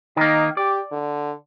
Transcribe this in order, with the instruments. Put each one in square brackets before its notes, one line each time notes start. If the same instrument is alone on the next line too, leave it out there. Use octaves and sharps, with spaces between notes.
[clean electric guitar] D#3 A#3 [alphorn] D#4
[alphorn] G4 [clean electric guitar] D5
[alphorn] D3